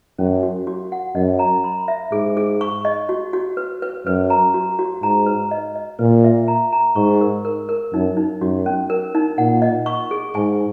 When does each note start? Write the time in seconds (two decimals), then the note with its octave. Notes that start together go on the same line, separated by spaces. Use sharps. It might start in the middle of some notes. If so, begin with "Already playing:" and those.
0.18 F#2 C#4
0.43 F#4
0.67 F#4
0.92 F#5
1.15 F#2 D#5
1.39 A#5
1.64 B5
1.88 E5
2.12 G#2 G#4
2.37 G#4
2.61 C#6
2.85 D#5
3.09 F#4
3.33 F#4
3.57 B4
3.82 B4
4.06 F#2 B4
4.30 A#5
4.54 F#4
4.79 F#4
5.02 G#2 A#5
5.26 B4
5.51 D#5
5.75 D#5
5.99 A#2 B4
6.24 E5
6.48 A#5
6.73 A#5
6.96 G#2 C#6
7.21 A#4
7.45 A#4
7.69 A#4
7.93 F#2 D#4
8.17 D#4
8.41 F#2 F#4
8.66 C#4
8.90 A#4
9.15 D#4
9.38 A#2 F#5
9.62 D#5
9.86 C#6
10.11 G#4
10.35 G#2 G#5